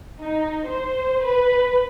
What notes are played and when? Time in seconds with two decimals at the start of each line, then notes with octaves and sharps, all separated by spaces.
0.20 D#4
0.67 C5
1.24 B4